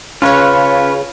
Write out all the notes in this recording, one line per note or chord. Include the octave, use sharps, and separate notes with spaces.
C#3 C#4 F4 B4 C#5